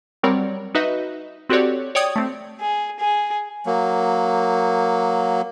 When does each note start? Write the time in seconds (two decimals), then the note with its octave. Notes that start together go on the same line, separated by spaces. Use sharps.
0.23 F#3 G3 C4 A#4 C#5 D5
0.75 D#4 F#4 B4 D#5 E5
1.49 C4 F#4 G4 A4 C#5 D5
1.95 C#5 D5 G5 D#6 G#6
2.16 A3 C4
2.60 G#4
2.99 G#4
3.66 F#3 A#3